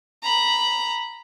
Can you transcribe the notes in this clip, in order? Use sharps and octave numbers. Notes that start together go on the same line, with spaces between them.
A#5 B5